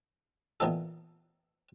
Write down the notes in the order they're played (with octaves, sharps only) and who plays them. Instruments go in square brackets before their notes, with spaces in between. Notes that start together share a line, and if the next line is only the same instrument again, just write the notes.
[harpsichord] A#2 D#3 E3 B3 D#4 A4